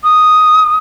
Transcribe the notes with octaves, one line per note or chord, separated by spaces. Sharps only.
D#6